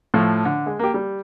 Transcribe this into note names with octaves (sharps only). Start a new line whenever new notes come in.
A2 F3 A3
D3
G#3
A#3 G4
G3